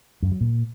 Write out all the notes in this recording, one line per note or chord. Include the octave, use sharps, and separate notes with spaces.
F#2
F#3
A#2